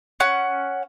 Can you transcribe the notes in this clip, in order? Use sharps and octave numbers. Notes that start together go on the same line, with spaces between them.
C#4 F#5